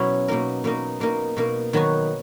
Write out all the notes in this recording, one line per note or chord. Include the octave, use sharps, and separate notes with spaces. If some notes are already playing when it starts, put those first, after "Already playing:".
Already playing: B2 F#3 C#4 E4
B2 A#3 D#4 A#4
B2 A#3 D#4 A#4
B2 A#3 D#4 A#4
B2 A#3 D#4 A#4
D#3 F#3 B3 D#4 F#4